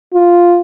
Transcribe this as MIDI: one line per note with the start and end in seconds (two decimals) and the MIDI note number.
0.14 0.61 65